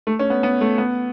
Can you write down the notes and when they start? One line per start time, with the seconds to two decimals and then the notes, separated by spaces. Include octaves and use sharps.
0.07 A3
0.19 C#4
0.30 B3
0.43 B3
0.61 A3
0.78 B3